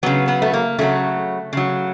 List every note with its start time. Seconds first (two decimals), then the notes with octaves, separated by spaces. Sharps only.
0.03 C#3 F#3 B3
0.28 B3
0.42 A3
0.53 A#3
0.79 C#3 F#3 A3
1.53 C#3 F#3